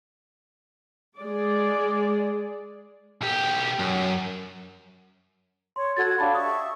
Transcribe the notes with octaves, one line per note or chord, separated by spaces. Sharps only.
G#3 G#4 D5
B1 G4
F#2
C#5 C6
F#4 A4 G#6 A6
D4 G4 C#5 F5 A5 B5
E5 C#6 D#6